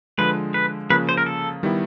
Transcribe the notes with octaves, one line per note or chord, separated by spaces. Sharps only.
D3 F3 G#3 B4
B4
C#3 F3 A#3 B4
C5
A#4
A4
D#3 G3 B3 E4